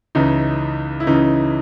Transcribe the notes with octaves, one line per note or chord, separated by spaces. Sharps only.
C#2 C#3 E3 D#4
E4
C#2 C#3 E3 D#4